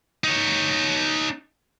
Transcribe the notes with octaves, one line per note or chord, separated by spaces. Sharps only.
D#4 C#5